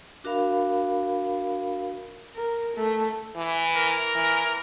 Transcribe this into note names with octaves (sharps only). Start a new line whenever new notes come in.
D4 F#4 A#4 E5 F5 B5
A#4
A3
E3
A#4
E3